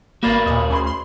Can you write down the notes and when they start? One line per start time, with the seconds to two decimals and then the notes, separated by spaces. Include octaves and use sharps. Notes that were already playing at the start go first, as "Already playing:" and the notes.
0.23 G#1 A#3 F#4 A#4 D5 B5 A#6
0.46 D#2 A#2 D#5
0.70 D2 C#4 G#4 C6
0.86 C6